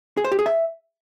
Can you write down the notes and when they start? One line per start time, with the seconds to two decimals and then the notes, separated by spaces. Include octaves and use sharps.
0.17 G#4
0.24 C5
0.32 G4
0.39 G#4
0.46 E5